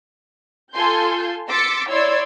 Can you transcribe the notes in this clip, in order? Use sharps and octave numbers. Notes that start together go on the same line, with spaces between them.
F4 A4 G#5 C6 G6
C6 D6 E6 A6 B6 C#7
E4 C#5 D5 C6 E6 G#6